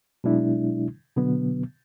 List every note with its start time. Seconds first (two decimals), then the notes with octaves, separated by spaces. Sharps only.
0.24 B2 F#3 G#3 D4 E4
1.16 B2 D3 F#3 B3